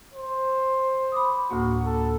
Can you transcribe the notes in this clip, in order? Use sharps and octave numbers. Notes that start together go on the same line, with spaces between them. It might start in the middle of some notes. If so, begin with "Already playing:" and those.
C5
B5 D6 D#6
D2 A2 A#3 F#4
A4